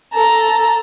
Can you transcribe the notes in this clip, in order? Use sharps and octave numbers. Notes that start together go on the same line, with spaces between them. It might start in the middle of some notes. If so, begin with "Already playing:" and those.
A4 A#5